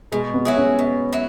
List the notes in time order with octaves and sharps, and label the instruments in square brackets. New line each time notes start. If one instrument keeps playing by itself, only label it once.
[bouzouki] B2 [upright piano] G#3
[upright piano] B3
[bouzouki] F#3 E4 G#4
[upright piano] C#4
[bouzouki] B2
F#3 E4